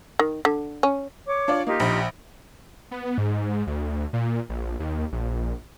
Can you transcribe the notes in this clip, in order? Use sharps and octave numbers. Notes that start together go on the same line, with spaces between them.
D#3
D3
C#4
C#5 D6
D4 F4 D5
A#3 D#4 F4 G4
A#1 B5
B3
G#2
D2
A#2
A#1
D#2
A#1